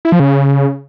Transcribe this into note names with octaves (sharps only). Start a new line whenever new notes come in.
E4
F3
C#3